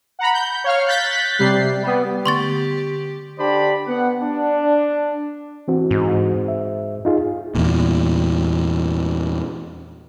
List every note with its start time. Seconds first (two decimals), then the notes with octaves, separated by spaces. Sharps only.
0.19 F#5 A#5 B5
0.34 G6
0.64 C#5 F5 F6
0.86 F#6 G6 A6 B6
1.38 C3 G3 C7
1.83 G3 B3
2.26 D3 A3 B3 G4 C6 C#6 A6
3.38 D3 D4 G4 C5 D5 B5
3.87 B3 F#5
4.22 D4
5.68 E3 C4 F#4
5.91 G#2
6.48 E5
7.05 D#4 F4 G#4
7.55 E2 A#2